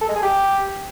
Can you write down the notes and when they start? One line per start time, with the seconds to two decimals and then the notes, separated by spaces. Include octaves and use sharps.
0.01 A4
0.09 G#3
0.16 G#4
0.23 G4